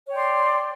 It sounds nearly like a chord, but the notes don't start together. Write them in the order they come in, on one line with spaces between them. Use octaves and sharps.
C#5 G5 D5 C6